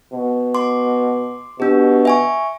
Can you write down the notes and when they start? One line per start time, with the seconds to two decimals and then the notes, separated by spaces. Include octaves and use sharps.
0.13 B2
0.55 C6 D6
1.60 B2 D4 G4
2.05 E5 G#5 C#6